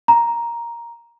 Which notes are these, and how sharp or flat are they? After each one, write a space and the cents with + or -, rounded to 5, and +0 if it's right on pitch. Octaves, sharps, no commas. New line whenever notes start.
A#5 +5